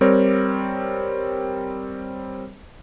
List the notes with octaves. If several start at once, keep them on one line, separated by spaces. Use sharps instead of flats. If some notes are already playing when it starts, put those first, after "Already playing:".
G3 C4 G4 A#4 C#5